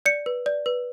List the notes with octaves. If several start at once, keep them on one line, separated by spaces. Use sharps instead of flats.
D5 C#7
B4
D5
B4